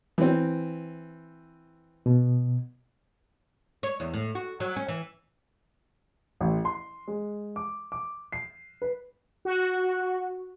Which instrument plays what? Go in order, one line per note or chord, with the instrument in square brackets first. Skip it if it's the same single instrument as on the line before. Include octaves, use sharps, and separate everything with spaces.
[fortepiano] E3 C4
[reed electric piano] B2
[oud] C#5
E2
A2
F#4
F#3
C#4
E3
[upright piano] A1
C6
G#3
D6
D6
C7
B4
[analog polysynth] F#4